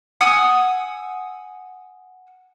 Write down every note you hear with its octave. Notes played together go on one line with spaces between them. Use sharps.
F#5 G#5 D#6 E6